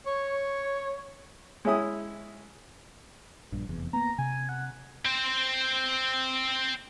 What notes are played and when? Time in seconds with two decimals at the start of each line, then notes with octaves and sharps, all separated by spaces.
0.06 C#5
1.65 G#3 C#4 E4 D#6
3.52 A#1 G2
3.69 F1 E2
3.93 A#3 B3 A#5
4.18 C3 G#5
4.49 F#5
5.06 C4 C5